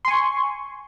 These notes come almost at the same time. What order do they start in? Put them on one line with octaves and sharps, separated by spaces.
C6 G#5 C#6